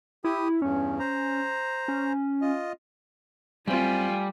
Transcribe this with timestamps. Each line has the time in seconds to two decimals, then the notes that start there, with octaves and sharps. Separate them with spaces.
0.24 E4 G4 D#6
0.62 E2 G2 C#4
0.99 C5 A#5
1.88 C#4
2.41 F4 D#5
3.68 F#2 G3 A3 C4 F4 G#5